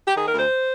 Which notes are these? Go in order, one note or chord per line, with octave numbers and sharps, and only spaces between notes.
G4
D#3 G#4
A#4
D2
C5